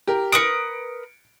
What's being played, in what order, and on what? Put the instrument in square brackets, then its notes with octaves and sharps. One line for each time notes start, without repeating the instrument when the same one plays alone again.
[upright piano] G4 A#4
[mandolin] A#4 B4 D#6 [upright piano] C#7 D7